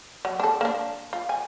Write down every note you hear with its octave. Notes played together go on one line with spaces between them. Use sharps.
F#3
D4 A4
A#3 D4
F4
G#5